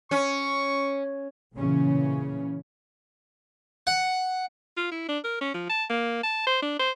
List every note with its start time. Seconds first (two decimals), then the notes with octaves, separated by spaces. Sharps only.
0.11 C#4 C#6
1.56 A#2 C#3 E3 C#4
3.87 F#5
4.77 F4
4.91 E4
5.09 D4
5.24 A#4
5.41 C#4
5.54 F3
5.69 A5
5.89 A#3
6.23 A5
6.47 C5
6.62 D4
6.79 C5